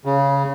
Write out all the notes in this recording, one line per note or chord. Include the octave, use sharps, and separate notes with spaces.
C#3